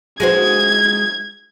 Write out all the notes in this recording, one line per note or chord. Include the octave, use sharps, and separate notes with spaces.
G#3 F#4 C5 G#6